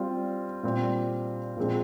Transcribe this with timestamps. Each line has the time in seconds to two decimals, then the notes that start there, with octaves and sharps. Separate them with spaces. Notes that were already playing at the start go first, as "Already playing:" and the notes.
Already playing: G3 C4 F4
0.63 A#2 G3 C4
1.57 A#2 F3 G#3 C4